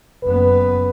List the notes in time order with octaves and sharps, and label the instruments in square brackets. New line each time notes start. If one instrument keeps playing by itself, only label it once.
[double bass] F#1 B3 [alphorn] B4